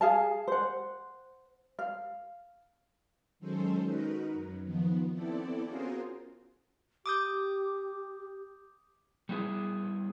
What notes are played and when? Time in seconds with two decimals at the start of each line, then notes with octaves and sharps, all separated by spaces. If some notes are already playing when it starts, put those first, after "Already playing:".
0.01 G#4 F5 A5
0.48 C5 F#5
1.79 F5
3.39 D#3 F#3 G#3 C#4 A4 C5
3.84 D#4 F#4 A#4 B4
4.33 F#2
4.64 D#3 F3 B3
5.11 B3 C4 E4 A4 D5
5.65 C#4 F4 F#4 G#4 A#4 C5
7.06 G4 D6 D#6 G6
9.29 G3 B3 E4 G#4